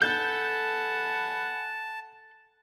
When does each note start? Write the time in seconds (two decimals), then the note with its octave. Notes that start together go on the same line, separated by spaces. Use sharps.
0.02 A4 F#5 G#5 A5 B5 G6